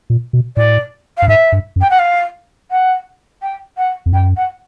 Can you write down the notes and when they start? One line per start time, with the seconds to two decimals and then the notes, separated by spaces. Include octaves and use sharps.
0.10 A#2
0.33 B2
0.57 A2 D5
1.18 G2 F5
1.28 G#2 E5
1.52 G2
1.76 F#2
1.81 G5
1.90 F#5
1.99 F5
2.71 F#5
3.42 G5
3.77 F#5
4.06 F2
4.13 F#2 G5
4.37 F#5